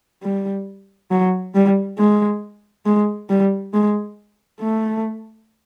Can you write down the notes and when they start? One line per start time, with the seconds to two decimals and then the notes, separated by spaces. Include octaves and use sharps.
0.23 G3
1.11 F#3
1.55 G3
1.99 G#3
2.86 G#3
3.29 G3
3.74 G#3
4.61 A3